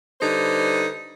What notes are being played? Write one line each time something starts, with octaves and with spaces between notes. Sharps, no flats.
D3 G3 D#4 B4 C5